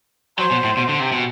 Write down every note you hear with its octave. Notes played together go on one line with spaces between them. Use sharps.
F#3 C5
B2
A2
B2
D3
C3
B2